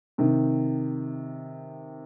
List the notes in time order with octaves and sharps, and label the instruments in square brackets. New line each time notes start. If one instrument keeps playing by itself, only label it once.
[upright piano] C3 D#3